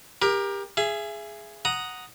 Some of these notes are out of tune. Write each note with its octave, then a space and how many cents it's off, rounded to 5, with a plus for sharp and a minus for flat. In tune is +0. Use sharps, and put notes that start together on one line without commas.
G4 +25 A#4 +20
G#4 +0 E5 +35
F#5 +0 A#5 +5 D#6 +0